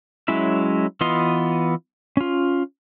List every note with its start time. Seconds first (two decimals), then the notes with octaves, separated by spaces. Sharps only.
0.28 F#3 G#3 C#4 E4 E5
1.01 E3 B3 F4 D#5 C6
2.17 C#4 F4